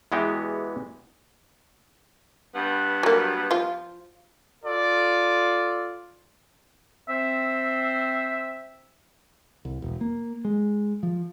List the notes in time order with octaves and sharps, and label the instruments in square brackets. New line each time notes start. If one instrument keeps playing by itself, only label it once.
[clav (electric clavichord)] E2 E3 G#3 B3 F#4 G4
[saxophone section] G2 B3
[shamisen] F#3 A#3
F3 F4
[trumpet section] F4 A4 D5
[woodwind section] C4 C5 [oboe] E5
[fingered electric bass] C2
E1
A#3
G#3
F3